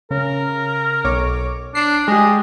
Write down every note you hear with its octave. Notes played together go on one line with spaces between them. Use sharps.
C#3 A#4
B1 C#5 D6
D4 C7
G#3 G4 D#5